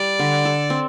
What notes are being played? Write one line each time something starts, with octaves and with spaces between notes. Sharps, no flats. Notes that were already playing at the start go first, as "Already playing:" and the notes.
Already playing: G3 D5
D3
A4
C4